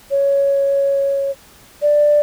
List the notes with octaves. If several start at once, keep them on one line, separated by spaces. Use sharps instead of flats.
C#5
D5